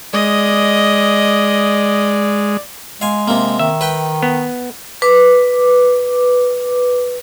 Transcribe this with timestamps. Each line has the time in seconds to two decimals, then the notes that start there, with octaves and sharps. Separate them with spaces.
0.14 G#3 D5 D#5
3.02 G#3 F5 G#5
3.28 C3 A#3
3.59 D#3 E5
3.81 B4 G5
4.23 B3
5.02 B4 D6